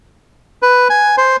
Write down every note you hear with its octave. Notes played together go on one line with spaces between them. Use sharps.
B4
G#5
C5